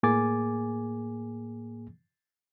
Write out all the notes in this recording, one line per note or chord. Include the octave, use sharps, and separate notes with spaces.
A2 A#3 G#4 G#5 D6 A6